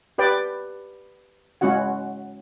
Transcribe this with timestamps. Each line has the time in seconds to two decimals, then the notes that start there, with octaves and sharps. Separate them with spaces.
0.18 G4 B4 D5 G5
1.61 G#3 C#4 E4 F#4 F#5